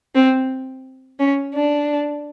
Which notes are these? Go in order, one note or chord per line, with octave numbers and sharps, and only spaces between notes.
C4
C#4
D4